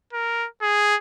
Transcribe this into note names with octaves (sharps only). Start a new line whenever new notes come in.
A#4
G#4